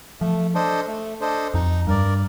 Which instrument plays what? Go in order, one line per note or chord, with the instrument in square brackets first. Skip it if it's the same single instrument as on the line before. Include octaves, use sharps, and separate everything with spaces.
[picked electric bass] F3 [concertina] A3
[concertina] D4 A4 C5 D#5
A3
D4 A4 C5 D#5
[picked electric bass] F2 [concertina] D#4
[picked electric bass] G2 [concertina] A#4 D5